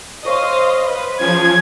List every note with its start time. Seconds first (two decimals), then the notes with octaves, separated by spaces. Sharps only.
0.25 C5 C#5 D#5 F5 C6
0.86 B4
1.20 F3 C#4 G#4 G#5 G#6